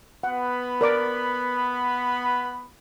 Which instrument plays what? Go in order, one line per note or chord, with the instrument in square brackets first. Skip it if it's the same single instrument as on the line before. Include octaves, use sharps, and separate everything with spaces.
[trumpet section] B3 B5 [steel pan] F#5
[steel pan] A#4 D5 D6